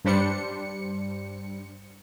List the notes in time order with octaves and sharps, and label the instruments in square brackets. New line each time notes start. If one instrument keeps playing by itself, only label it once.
[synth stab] G2 G3 D4 C5 C#7